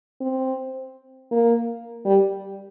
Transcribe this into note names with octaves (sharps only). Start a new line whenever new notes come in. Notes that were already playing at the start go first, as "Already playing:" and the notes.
C4
A#3
G3